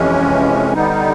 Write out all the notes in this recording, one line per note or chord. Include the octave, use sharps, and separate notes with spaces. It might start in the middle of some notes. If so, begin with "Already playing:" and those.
Already playing: F2 C3 E3 G#3 C#4
D3 G3 B3 D#4